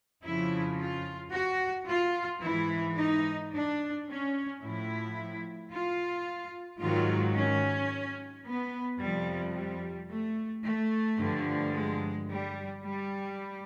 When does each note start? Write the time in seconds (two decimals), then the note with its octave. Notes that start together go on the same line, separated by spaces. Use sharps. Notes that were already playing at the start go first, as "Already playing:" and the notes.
0.23 F2 C#3 F3 E4
0.79 F4
1.33 F#4
1.87 F4
2.43 G#2 E3 E4
2.97 D#4
3.52 D4
4.07 C#4
4.62 A2 F3 E4
5.71 F4
6.80 G#2 D#3 F#3 F4
7.35 C#4
8.45 B3
9.00 F2 C3 F3 G3
9.54 G3
10.09 A3
10.64 A3
11.19 G2 D3 F3
11.73 G#3
12.29 G3
12.83 G3